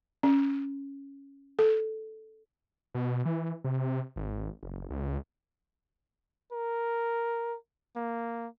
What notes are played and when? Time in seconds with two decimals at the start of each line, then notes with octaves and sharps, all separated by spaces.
0.23 C#4
1.59 A4
2.94 B2
3.25 E3
3.64 C3
4.16 G#1
4.63 F#1
4.90 C#2
6.52 A#4
7.96 A#3